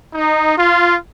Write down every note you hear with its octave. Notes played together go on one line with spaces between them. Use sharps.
D#4
F4